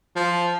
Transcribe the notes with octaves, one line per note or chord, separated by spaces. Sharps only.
F3